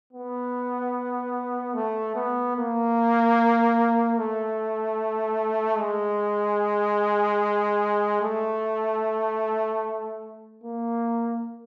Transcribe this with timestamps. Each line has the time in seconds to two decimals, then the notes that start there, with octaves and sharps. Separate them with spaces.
0.13 B3
1.74 A3
2.15 B3
2.56 A#3
4.18 A3
5.79 G#3
8.22 A3
10.63 A#3